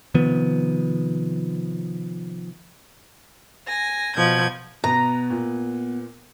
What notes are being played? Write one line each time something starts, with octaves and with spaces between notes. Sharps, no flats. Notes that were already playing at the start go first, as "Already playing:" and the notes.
C3 D#3 F3 B3
G#5 A#6
B2 F3 G6 G#6
B2 B3 A#5
A#2